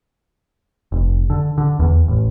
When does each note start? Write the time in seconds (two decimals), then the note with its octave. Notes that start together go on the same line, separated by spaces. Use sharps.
0.92 F1
1.30 D3
1.58 D3
1.79 E2
2.08 A1